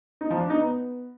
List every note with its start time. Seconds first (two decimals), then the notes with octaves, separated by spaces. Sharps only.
0.21 D#4
0.31 F3
0.40 D4
0.50 D#4
0.60 B3